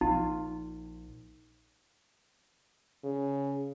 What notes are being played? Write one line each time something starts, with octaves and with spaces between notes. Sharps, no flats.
A#1 D#4 F4
C#3